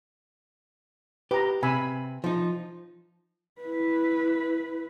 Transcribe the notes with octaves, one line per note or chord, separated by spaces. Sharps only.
G4 B4 A#5
C3 G#5 B5 E6
F3 D#4
E4 B4